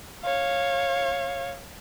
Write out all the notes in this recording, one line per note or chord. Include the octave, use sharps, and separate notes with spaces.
C#5 F5